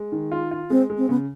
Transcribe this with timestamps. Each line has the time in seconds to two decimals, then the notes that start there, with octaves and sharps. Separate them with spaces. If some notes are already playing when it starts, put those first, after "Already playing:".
Already playing: G#3
0.12 D#3
0.32 F4
0.51 F4
0.70 G#3 C4
0.90 G#3
0.98 C4
1.09 C#3 B3